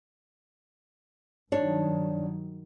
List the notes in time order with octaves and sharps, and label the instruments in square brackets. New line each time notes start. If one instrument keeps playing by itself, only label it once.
[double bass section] G2 D#3 F#3 [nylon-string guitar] D4 C#5